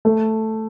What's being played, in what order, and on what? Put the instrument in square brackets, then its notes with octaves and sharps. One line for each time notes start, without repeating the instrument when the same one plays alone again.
[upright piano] A3